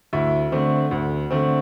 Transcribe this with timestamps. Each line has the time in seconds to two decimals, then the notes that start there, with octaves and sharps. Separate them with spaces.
0.13 D2 E4 E5
0.52 D3 A3 C4
0.91 D2
1.31 D3 A3 C4